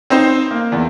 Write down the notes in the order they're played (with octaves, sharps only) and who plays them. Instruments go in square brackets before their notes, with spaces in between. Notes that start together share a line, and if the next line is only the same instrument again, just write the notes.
[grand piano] C4 D#4 C5
A#3
E2